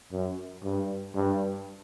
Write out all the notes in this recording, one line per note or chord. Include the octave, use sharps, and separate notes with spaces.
F#2
G2
G2